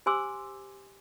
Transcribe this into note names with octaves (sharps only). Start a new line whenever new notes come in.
G4 C5 G#5 C6 D6 E6